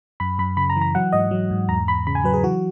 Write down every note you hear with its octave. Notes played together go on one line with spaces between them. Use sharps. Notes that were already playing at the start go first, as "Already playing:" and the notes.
F#2 B5
F#2 B5
C#3 B5
A#5
E3
A#5
F#3 F#5
G#2 D#5
F#3
G#2
E2 A#5
E2 B5
C#3 B5
G#5
F#3 B4
G#4
E3 F#4